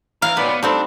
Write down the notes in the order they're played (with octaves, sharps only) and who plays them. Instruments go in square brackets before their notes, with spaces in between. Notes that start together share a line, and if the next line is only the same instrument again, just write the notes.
[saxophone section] E3 [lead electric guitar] A#4 [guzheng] F5
[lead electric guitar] A#2 B3 [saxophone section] D#3 F#3 D5 [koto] B4
[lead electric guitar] B3
[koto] G3 C4 D#4 [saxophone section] A3 A4 [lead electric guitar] D4